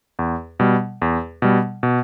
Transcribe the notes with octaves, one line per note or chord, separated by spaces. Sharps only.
E2
B2 G3
E2
B2 G3
B2